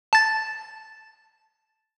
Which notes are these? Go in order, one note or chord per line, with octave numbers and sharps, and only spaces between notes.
A5 A6